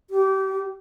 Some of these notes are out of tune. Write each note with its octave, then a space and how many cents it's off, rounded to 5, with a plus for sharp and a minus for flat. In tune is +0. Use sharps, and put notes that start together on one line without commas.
G4 -30